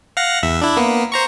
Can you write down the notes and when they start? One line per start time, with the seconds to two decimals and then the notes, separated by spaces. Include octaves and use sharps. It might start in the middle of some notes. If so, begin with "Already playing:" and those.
0.17 F5 F#5 A#6
0.43 E2 E5
0.62 D4 E4
0.77 A#3 B3
1.12 C5 A#5 C#6